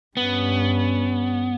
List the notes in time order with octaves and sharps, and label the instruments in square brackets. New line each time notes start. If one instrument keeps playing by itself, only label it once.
[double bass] G2 C#4 [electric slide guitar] B3